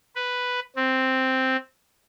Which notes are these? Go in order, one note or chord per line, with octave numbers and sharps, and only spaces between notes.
B4
C4